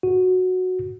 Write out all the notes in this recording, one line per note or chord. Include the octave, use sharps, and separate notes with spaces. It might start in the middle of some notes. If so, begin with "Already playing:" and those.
F#4